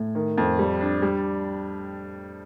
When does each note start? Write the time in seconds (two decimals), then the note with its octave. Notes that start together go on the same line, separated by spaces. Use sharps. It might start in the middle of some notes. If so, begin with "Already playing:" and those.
Already playing: A2
0.15 D#3
0.38 F2
0.59 G3
0.81 D4
1.02 G3